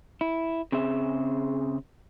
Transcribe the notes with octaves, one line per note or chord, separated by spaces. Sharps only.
E4
C#3 C4 G#4 E5